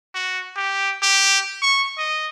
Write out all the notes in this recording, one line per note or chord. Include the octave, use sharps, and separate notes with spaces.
F#4
G4
G4
C#6
D#5